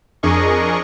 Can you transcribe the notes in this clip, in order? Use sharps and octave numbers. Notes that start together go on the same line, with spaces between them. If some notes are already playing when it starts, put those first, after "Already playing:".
F2 D4 G#4 A#4 D#5 C#6